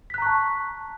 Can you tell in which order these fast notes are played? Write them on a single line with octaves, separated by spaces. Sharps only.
B6 F#6 A#5 C#6 A5